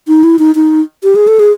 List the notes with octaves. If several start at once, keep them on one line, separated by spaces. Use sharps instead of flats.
D#4
E4
D#4
D#4
G4
G#4
A4
G#4